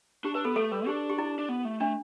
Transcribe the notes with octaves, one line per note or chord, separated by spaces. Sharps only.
D4 G4
D4 B4
B3 A4
A3 A4
G3 B4
D4 G4
G4
E4
D4
B3
A3
A3 D4